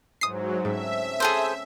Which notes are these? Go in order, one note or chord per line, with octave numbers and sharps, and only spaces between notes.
G#2 E3 F#3 G#3 C5 D#6 C7
G#2 C#3 A3 C4 E5
G#4 A4 C5